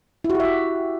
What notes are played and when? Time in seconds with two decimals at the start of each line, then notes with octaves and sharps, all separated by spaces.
0.24 E4
0.30 F#4
0.35 G4
0.40 E5
0.45 F#4